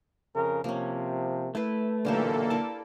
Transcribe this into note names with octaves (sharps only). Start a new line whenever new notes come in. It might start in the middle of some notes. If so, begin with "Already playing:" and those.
F2 C#3 A#4
C3 F3 A#3 C#4
A3 E4 B4
B1 A#2 D3 E3 A#3 G4 A4 E5
E4 D5 A5